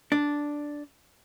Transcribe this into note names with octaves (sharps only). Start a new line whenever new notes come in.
D4